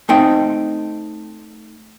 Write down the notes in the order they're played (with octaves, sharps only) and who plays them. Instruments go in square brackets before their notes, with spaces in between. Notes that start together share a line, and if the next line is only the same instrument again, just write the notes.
[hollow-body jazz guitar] A3 C4 D#4 D#5 G5